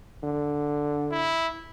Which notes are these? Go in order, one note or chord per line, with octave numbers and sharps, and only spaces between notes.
D3
E4